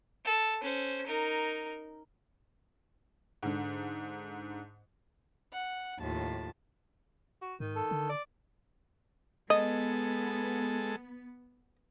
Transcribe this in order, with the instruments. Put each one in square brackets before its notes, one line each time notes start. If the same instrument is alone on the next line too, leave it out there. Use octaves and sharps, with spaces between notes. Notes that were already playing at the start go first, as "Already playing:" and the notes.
[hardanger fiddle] A4
C#4 C5
D#4 A#4
[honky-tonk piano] G#2 D3
[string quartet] F#5
D#2 A2 F3 A5
[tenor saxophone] F#4
[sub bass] G#2 [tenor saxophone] D#3
[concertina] A4
[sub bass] D3
[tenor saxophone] D5
[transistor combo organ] G#3 A4 [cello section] B3 [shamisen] D#5